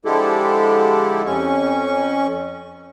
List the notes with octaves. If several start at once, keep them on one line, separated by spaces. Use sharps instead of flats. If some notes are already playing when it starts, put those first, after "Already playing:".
D3 F3 G#3 E4 G4 A4
F2 C#4 C#6